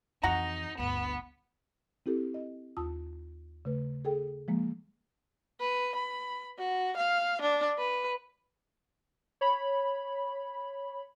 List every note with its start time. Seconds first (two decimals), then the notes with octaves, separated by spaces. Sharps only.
0.23 F2 E3 D#4 F#4 F#5 A#5
0.78 G1 D2 B3
2.06 C4 E4 G4 A4
2.34 D#5
2.77 D#2 F4 A5 D#6 E6
3.65 C#3 A3 B4
4.05 G#4 A4 G5
4.48 F3 G#3 A#3
5.60 B4
5.95 B5
6.59 F#4
6.97 F5
7.41 D4
7.78 B4
9.41 C#5 B5